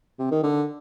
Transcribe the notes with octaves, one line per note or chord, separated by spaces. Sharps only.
C3
D#3
D3